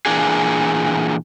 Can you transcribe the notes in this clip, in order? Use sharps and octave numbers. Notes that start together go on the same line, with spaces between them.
A#2 E3 D4 G#4